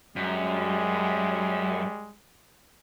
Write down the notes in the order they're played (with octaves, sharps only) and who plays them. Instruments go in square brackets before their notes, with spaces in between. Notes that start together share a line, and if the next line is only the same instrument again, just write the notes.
[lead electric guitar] F#2 [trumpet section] G3 G#3